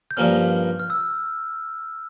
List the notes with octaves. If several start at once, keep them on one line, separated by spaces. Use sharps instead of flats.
G6
G2 F3 A#3 C#4 F6
F6
E6